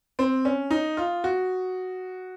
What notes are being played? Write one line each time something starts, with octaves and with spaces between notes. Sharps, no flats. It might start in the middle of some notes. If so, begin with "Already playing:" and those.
C4
C#4
D#4
F4
F#4